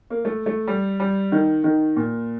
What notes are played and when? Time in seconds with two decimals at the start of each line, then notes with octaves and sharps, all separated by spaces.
0.10 A#3
0.25 A3
0.46 A3
0.68 G3
1.00 G3
1.32 D#3
1.64 D#3
1.97 A#2